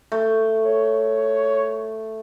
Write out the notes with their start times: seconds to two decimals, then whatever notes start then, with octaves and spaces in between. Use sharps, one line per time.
0.12 A3
0.66 C#5